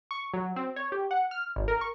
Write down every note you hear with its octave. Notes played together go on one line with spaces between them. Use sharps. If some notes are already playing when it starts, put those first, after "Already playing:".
C#6
F#3
C4
C#5
G4
F#5
F6
G#1
A#4
C#6